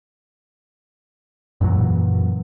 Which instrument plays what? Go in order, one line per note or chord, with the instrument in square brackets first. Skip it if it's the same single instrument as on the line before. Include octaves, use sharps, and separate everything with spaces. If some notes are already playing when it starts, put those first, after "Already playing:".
[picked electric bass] F#2 A#2 E3 F#3